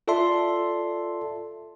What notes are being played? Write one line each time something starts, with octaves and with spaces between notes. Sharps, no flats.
F4 A4 D5 E5 A5 C6